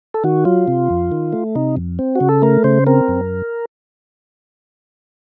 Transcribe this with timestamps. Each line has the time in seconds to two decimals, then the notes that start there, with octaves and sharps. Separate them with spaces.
0.14 A4
0.24 D#3 F#4
0.45 F#3 F4
0.68 C3
0.90 F2
1.12 D#3
1.33 A3
1.55 C3 D#4
1.77 F2
1.99 C4
2.15 F#4
2.21 C#3
2.29 A4
2.42 A3 A#4
2.64 C#3 C5
2.86 C4 A#4
3.08 F#2